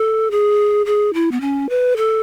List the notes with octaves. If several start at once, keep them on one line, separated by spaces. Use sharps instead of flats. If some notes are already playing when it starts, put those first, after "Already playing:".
Already playing: A4
G#4
G#4
E4
B3
C#4
B4
A4